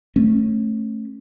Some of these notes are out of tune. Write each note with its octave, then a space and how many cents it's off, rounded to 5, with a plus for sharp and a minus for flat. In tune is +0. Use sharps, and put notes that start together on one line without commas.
A3 +0 C#4 -25